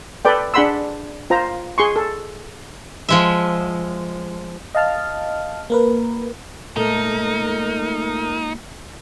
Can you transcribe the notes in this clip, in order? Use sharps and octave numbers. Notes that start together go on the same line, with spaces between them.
A4 B4 D5 G5
D4 G#4 F#5 B5 C6 E6
F4 C5 A#5
G#4 C6 C#6
A4
F3 G#3 E5
D#5 F5 A5 F6
A#3 A#4 B4
A#2 G#3 A3 D#4 A4 A#4